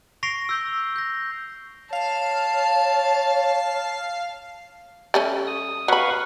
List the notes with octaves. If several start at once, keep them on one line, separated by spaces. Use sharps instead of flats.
C#6 A#6 C7 D7 F7
E6 G6 G7
G6 A#6
C#5 F5 A5
G3 A3 C#4
D#6
F#3 B4 F5 B5 C#6